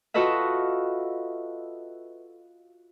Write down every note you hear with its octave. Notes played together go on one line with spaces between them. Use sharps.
F4 F#4 A4 B4 D#5 E5